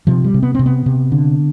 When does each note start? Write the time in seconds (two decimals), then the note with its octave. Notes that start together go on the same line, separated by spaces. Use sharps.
0.07 C3 F3
0.24 G3
0.34 C3
0.43 B3
0.55 C3 C4
0.66 B3
0.86 C3
1.12 D3